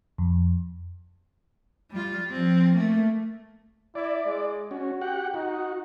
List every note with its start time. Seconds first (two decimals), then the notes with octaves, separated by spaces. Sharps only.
0.18 F2
1.91 G3 F4
2.30 F3 C4
2.75 A3 A#3
3.95 E4 D5
4.26 G#3
4.71 C#4 F#4
5.01 G4 F#5
5.34 D#4 F#4